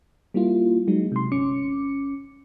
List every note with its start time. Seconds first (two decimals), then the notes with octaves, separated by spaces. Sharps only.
0.34 G3 A#3 E4 F4
0.88 F#3 G#3 D#4
1.12 C3 C6
1.32 G1 C#4 D6 C#7